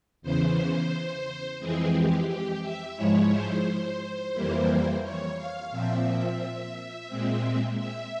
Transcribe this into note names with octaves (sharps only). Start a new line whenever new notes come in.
E2 C#3 E3 C5
F2 E3 G#3 C4 G#4
G4
G4
E5
G#2 F3 G#3 E4 C#5
C5
F2 E3 G3 A#3 E4
C#5
F5
A#2 F3 C4 E5
A#2 G#3 C4
E5